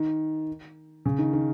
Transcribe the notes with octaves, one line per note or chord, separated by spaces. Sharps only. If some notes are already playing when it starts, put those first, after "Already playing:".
Already playing: D#3
C#3
D#3
D#3